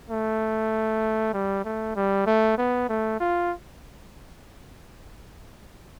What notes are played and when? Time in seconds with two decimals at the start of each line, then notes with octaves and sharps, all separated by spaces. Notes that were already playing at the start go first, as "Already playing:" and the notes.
0.10 A3
1.34 G3
1.65 A3
1.96 G3
2.27 A3
2.58 B3
2.89 A3
3.20 F4